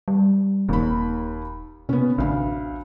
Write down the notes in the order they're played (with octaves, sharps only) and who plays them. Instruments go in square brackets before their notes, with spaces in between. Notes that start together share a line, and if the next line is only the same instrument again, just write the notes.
[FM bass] G3
[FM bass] D#1 [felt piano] D#2 B5
[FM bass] C3 [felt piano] B3 C#4
[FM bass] A1 [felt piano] D2 F5